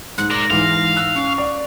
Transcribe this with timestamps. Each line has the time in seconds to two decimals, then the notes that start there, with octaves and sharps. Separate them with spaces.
0.18 G#2 F#6
0.31 A#4 D5 A#6
0.50 G#2 E3 F5
0.96 E6 F#6
1.15 C#4 C#6
1.38 D5